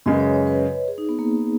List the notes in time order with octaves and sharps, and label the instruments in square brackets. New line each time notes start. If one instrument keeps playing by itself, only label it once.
[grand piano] F#2 C#3 G#3 [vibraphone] D#5
[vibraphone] B4
C#5
C#5
B4
G#4
D#4
B3
A#3